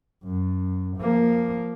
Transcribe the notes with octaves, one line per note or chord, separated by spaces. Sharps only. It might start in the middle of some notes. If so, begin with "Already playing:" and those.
F#2
F3 A#3